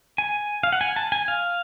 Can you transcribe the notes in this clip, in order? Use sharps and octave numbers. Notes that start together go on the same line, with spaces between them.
G#5
F5
F#5
G#5
A5
G#5
F5